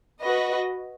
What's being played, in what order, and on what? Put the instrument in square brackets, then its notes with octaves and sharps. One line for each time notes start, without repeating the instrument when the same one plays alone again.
[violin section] F#4 B4 D#5